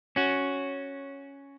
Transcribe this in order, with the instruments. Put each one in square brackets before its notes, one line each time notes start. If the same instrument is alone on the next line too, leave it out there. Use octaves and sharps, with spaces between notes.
[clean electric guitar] C#4 F#4